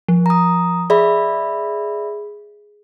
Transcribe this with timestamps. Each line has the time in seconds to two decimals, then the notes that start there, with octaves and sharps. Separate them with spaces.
0.08 F3
0.26 A#5 D#6
0.90 G#4 D5 E5 B5